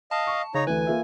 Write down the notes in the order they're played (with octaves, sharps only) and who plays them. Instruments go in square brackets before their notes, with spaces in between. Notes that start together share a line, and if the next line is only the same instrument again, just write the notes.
[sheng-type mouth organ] D#5 F5 [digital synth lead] A5
[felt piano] C#6
[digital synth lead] C#3 [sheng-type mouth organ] D#4 C#5 A#5
[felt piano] D2 E3 [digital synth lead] B4 [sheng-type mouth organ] G#5
[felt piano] A#3 F4 E5